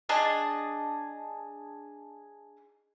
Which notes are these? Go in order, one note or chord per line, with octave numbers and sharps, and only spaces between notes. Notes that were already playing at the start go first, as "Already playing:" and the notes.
D4 G#4 D#5 A5